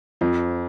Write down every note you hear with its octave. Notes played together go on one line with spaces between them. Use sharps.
F2 F3